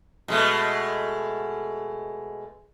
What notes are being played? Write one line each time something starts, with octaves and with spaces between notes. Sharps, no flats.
B2 G#3 A3